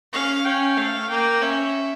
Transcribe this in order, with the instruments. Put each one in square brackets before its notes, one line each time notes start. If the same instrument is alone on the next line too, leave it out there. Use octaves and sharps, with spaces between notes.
[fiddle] C#4 [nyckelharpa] F5
[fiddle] C#4 [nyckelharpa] G5
[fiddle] A3 [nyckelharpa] F5
[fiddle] A#3 [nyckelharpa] G5
[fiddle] C#4 [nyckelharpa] E5